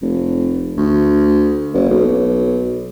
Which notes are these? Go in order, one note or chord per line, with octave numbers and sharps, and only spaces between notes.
F1
D2
F#1
B1